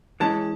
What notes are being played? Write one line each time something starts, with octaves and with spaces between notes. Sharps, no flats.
E3 G#3 C#4 A5